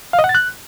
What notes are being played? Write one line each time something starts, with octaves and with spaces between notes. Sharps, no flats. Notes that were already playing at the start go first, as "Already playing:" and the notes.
F5
D#5
F#5
A6
F#6